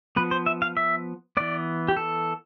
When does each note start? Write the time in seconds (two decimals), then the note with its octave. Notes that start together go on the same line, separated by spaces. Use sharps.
0.16 F3 B3 B4
0.31 C5
0.46 E5
0.62 F5
0.77 E5
1.37 E3 B3 D5
1.88 G4
1.97 A4